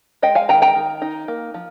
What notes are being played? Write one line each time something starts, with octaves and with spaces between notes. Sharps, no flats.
G#3 D#5 G5
F5 G#5
D#3 G5 A#5
G5 A#5
D#3
D#4
A#3
F3